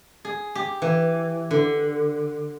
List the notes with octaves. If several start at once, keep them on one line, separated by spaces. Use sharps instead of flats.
G#4
G4
E3
D3